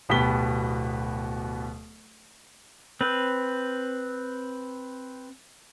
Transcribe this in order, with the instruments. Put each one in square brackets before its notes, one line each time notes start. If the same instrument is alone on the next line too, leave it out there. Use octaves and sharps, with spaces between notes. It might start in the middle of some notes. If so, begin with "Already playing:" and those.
[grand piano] D1 B2 B3 G4 B6 G7
[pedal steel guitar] C4 B4